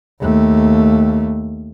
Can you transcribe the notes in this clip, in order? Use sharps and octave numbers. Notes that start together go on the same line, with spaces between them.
D#2 A3